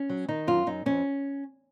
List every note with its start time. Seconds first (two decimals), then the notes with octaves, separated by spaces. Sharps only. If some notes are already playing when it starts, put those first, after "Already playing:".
Already playing: C#4
0.10 F#3
0.28 D#3 D#4
0.47 F#2 F4
0.67 F#2 D#4
0.86 F2 C#4